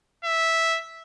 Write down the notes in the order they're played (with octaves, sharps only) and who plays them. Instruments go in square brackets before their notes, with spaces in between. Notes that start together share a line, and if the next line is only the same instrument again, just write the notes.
[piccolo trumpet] E5